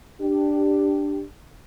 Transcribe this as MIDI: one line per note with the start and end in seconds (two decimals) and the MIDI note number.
0.22 1.24 62
0.22 1.24 67